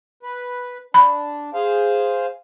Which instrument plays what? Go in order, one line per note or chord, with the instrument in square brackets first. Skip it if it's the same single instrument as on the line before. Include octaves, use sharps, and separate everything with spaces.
[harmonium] B4
[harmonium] D4 [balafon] B5
[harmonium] G#4 C5 F5